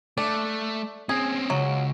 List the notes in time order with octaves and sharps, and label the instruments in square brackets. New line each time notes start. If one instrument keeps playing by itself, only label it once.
[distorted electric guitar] A3 [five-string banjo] D4
[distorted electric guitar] C4 C#4 [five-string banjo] G#4
[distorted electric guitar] C#2 [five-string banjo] F#3